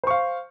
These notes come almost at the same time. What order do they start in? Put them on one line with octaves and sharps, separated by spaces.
C5 C#6 F5